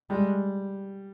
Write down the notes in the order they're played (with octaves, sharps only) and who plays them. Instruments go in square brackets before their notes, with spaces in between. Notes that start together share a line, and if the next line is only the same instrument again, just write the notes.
[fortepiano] G3 [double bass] G#3